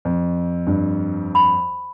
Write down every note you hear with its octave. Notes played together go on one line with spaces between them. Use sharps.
F2
G2
B5